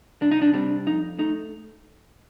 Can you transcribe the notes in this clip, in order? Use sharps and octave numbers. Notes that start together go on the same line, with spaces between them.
C2 D4
D#4
D4
C3 G3 C4 D4
F2 D#4
A3 D#4